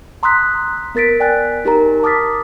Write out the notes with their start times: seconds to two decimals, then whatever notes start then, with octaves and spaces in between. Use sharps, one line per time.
0.23 A#5 C6 D#6 E6 F#6 B6
0.95 B3 A#4 A6 B6 D7
1.20 D5 G5 G#5 F#6 A6
1.65 D#4 G4 A#4 A#5
2.03 A5 D6 D#6 F6 A6 B6